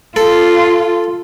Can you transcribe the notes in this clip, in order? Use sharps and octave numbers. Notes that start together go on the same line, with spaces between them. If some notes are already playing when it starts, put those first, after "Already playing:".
F4 A4